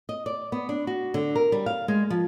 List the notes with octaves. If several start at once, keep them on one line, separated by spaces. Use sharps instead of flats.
D#5
D5
B3
D4
F#4
D3
A#4
G3
F5
G#3
F3